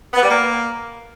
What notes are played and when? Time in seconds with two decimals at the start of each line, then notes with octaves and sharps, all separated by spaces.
0.14 B3
0.22 G3
0.30 A#3